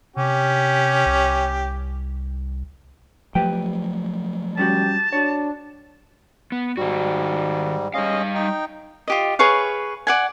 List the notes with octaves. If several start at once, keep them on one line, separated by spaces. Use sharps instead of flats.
C3 C#4 G4
C2
F3 F#3 A3 G4 B4 G5
G3 C#4 F#4 G4 A5
D4 F#4 C#5
B3
G#2 D#3 G3 F#4
G3 G#3 C#4 D#5 F5
D#4 G5
F4 G4 D#5
G#4 B4 C#5 F5
D5 F#5 G#5